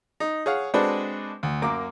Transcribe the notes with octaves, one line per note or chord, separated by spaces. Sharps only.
D#4
G#4 C#5 F5 F#5
G#3 C4 D4 F#4 A4 B4
D2
F#2 A#3 D6